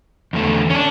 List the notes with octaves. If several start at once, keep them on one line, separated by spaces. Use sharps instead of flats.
E2 D3 A3
C#4
D4